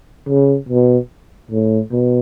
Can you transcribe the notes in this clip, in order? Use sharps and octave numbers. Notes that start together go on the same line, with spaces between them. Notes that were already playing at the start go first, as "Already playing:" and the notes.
C#3
B2
A2
B2